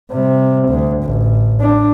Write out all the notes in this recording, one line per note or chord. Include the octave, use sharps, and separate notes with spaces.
C3 G3
D2
A1
D4